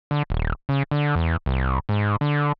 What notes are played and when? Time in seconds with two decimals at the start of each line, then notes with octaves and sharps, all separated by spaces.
0.11 D3
0.30 D#1
0.69 C#3
0.91 D3
1.15 E2
1.46 C2
1.89 G#2
2.21 D3